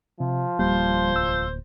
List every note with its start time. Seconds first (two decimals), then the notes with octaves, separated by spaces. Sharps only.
0.20 C3 F3
0.59 D1 G3 A#3 C5
1.12 C2 E6